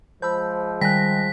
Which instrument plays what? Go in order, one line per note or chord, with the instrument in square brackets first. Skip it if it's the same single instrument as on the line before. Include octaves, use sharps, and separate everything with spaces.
[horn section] F3 G#3 [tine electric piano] C5 A5 B5 [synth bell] E6 G6
[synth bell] D#3 G3 A#6 [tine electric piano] G5 G#5 F#6 [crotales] B6